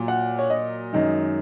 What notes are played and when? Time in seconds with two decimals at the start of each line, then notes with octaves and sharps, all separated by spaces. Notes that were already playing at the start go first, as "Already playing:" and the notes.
Already playing: A#2 F#3
0.08 F#5
0.39 C#5
0.50 D#5
0.93 F#2 D#3 G#3